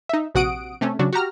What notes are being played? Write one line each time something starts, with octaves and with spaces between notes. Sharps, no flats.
D#4 E5
A#1 C3 F#4 F#5 D#6 D7
C3 A3 C#4
C#3 F#3 D4 F#4
F#4 G4 A#5 F6